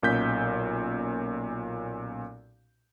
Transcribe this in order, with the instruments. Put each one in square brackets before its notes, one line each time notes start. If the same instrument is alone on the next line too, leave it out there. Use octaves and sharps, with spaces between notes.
[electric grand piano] B1 A#2 C#4 G6 B6